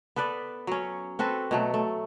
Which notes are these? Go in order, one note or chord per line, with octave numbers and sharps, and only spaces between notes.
B3 A4 B4 D5
F#3 C#4
C4 F#4 A4 B4
B2 F#3 A3
A3